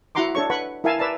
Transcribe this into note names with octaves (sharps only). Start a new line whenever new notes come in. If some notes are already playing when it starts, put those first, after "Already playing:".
E4 F#4 F#5 A#5 C6 D6
D4 A4 C#5 C#6
B4 F#5 B5 C#6
E4 A#4 E5 F5 G#5 A5
B4 D5 E5 A5 A#5